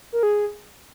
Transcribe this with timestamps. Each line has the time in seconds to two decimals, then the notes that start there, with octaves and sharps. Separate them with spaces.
0.13 A#4
0.23 G#4